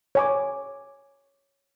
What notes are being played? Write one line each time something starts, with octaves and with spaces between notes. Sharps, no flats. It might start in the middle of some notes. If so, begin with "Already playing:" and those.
C#5 G#5 D6